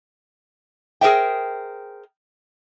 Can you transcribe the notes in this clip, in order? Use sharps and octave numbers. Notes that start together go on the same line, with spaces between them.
G#4 A#4 C5 E5 G5